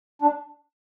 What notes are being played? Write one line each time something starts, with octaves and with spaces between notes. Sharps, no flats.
D4